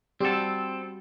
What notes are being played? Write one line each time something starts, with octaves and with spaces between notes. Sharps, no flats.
G3 C4 F#4 A4